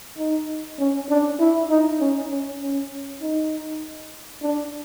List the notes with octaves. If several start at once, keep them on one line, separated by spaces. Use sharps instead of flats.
D#4
C#4
D4
E4
D#4
C#4
C#4
C#4
D#4
D4